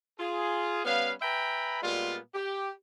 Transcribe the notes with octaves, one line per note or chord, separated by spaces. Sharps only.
F4 G#4
G3 B3 C#4 B4 F5
B4 E5 G5 G#5 A#5 B5
A#2 G3 G#3 B3 F4
G4